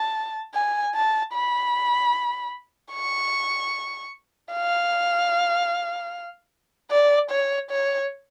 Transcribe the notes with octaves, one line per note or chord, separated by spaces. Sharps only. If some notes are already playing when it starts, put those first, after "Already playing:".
Already playing: A5
G#5
A5
B5
C#6
F5
D5
C#5
C#5